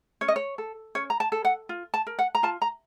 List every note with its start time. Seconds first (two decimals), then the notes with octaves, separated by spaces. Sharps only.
0.21 C#4 C#5
0.28 D#5
0.36 C#5
0.58 A4
0.95 C#4 C#5
1.10 A#5
1.20 A5
1.32 A4
1.45 F#5
1.69 F4
1.94 A5
2.07 A#4
2.19 F#5
2.35 A#5
2.43 F4 A5
2.62 A#5